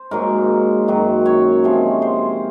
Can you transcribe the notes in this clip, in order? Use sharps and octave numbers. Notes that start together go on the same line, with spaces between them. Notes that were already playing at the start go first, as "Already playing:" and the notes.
Already playing: C5
G#2 F#3 A#3 A#4
F#2 D#3 F#3
C#5
C3 F3 G#3
C5